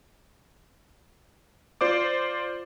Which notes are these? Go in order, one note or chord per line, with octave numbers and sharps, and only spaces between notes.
F4 C5 D5 D6